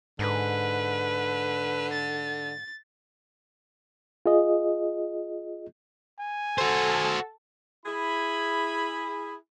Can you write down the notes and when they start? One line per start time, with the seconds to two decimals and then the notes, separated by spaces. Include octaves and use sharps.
0.19 G#2 D3 B4
1.93 A6
4.26 F4 G#4 D#5
6.20 G#5
6.58 F#4 A4 C5
7.86 E4 G#4 B5